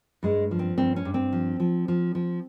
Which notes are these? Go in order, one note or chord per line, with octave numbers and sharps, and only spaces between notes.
G2 G#3
F3
C4
G2 C4
C#4
G2
C4
F3
F3
F3
F3